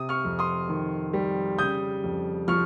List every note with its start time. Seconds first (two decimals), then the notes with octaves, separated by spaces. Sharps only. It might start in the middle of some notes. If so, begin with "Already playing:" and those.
Already playing: C3 D#6
0.09 C#6 F6
0.25 F2
0.39 C6 D#6
0.69 D#3
1.13 G3
1.58 C#3 D#6 G6
2.04 F2
2.48 F3 C#6 F6